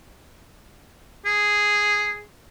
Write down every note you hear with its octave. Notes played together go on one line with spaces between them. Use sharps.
G#4